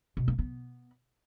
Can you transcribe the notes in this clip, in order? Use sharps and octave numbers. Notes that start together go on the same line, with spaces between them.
B2
A#3
B3